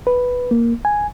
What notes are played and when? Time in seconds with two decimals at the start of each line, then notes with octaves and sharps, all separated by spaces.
0.07 B4
0.51 A#3
0.85 G#5